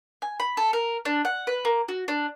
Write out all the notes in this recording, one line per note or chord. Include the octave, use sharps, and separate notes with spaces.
G#5
B5
A4
A#4
D4
F#5
B4
A#3
F#4
D4